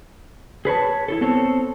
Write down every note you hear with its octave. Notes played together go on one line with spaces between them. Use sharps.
G#4 B4 C#5 A5
E4 F4 A4
B3 C4 A4 C#5